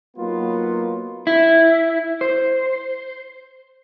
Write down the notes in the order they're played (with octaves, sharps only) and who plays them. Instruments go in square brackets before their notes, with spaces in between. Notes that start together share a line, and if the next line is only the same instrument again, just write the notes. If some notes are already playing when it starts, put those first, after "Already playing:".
[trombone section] F#3 A#3 B3 D#4 F4
[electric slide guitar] E4
C5